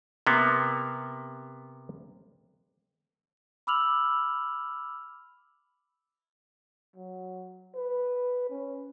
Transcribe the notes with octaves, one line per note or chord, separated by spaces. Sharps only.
C3 A#3 B3
B5 D6 E6 F6 F7 F#7
F#3
B4
C#4